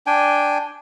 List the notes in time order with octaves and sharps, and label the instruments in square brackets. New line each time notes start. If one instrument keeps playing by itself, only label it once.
[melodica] D4 G5 G#5